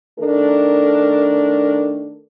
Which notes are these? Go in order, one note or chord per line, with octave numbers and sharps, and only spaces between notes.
D#3 A3 D4 A4 A#4